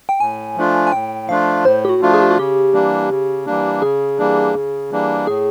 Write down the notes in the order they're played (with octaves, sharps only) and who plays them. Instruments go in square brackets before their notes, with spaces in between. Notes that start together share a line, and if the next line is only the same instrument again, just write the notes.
[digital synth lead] G5
[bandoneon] A2 [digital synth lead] G#5
[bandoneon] F3 A3 D4 F4
[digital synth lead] G#5
[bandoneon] A2 [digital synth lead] G5
[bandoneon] F3 A3 D4 F4 [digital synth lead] F5
[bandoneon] A2 [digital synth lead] C5
[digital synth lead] G4
F#4
[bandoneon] F3 A3 D4 F4
[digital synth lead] G#4
G4
F#4
[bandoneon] C#3 [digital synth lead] G4
[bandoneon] E3 G3 A#3 D4
C#3
E3 G3 A#3 D4
[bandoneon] C#3 [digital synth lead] G#4
[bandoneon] E3 G3 A#3 D4
C#3
E3 G3 A#3 D4
[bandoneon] A2 [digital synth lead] G#4